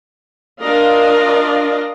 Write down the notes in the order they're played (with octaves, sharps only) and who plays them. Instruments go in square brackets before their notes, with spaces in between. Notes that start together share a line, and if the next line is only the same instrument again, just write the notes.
[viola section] D4 F4 A#4 D5 D#5 F5